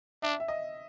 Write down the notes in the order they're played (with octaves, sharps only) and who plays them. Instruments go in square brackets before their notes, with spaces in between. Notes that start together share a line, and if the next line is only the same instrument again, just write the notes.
[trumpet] D4 [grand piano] E5
[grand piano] E5
D#5